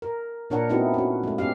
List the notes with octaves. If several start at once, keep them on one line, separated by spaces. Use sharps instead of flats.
A#4
A#2 D4 A#4 C#5 F#5
A3 B3 C4 D#4 E4 F#4
C#4 F#4
G#3 A3
B3 C#4 G4 F5